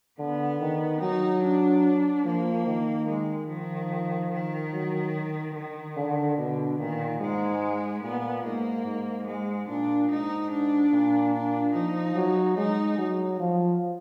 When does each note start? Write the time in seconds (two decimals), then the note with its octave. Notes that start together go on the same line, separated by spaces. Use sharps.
0.19 D3 B3
0.60 D#3
1.01 F#3 D#4
1.43 D4
2.25 F3 A#3
2.67 D#3
3.08 G#3
3.49 D#3 F3
4.32 D#3
4.73 F#3
5.55 D#3
5.97 D3
6.38 B2 D3
6.79 A#2 D#3
7.20 G#2 G#3
8.03 A#2 B3
8.44 G#2 A#3
8.86 G#2
9.27 G#3
9.68 A#2 D4
10.10 G#2 D#4
10.50 D4
10.92 A#2
11.33 D4
11.75 F3 D#4
12.16 F#3
12.57 G#3 D#4
12.98 F#3
13.40 F3